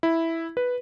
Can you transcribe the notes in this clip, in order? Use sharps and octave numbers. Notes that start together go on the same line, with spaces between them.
E4
B4